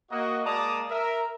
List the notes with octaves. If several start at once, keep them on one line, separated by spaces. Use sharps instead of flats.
A#3 F#4 D#5
G#3 A#3 D5 A5 A#5 D#6
A#4 E5